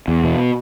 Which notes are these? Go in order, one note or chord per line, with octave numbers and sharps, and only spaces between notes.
E2
B2